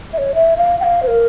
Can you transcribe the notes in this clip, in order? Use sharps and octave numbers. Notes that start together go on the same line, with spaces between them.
E5
C#5
E5
F5
G5
F5
C5
A#4